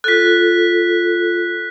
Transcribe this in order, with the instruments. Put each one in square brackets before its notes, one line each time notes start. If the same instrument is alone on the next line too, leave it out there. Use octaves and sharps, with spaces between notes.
[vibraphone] F4 A4 [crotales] F#6 B6